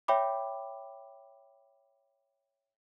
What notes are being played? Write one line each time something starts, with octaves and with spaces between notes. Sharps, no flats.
C#5 E5 G5 B5 D6